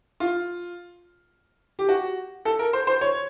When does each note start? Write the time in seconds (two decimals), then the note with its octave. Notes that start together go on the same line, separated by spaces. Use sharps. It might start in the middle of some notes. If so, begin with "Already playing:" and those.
0.20 F4
1.79 G4
1.89 F#4
2.45 A4
2.59 A#4
2.73 C5
2.87 C5
3.01 C#5